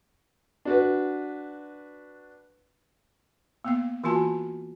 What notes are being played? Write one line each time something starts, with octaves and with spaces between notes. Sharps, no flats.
D4 F#4 B4
A#3 B3 F5
E3 A#3 F4 F#4 G#5 A5